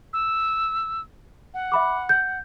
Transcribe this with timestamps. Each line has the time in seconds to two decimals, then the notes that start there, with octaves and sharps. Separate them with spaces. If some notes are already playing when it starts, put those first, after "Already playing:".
0.13 E6
1.54 F#5
1.72 E5 B5 D6
2.09 G6